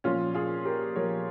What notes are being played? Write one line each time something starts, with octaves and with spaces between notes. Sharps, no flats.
A#2 F3 C#4 F4
F4 G#4
G4 A#4
A#2 F3 A#4 C#5